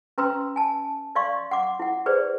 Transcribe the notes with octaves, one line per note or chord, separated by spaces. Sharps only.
C#4 B4 A#5 C6 E6
G#5 A5
D5 D#5 F5 C6 C#6
F#5 C6 D6
E4 F#5
G#4 B4 C5 D5